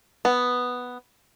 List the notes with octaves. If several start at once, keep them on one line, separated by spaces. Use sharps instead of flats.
B3